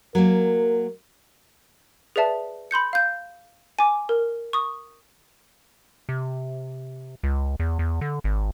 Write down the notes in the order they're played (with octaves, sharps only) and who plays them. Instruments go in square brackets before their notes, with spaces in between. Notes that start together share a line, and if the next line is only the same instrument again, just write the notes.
[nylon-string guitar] F#3 A#3 [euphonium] A#4
[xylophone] G#4 B4 D5 E5 A5
B5 C6 G6 C#7
F5 G6
G#5 D6
A#4
C#6 D#6
[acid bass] C3
C#2
E2
E2
D3
G#1